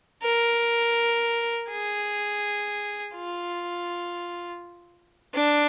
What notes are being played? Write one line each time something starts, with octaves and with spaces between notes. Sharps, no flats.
A#4
G#4
F4
D4